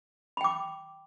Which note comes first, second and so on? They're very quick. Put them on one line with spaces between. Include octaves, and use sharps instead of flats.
B5 G5 D6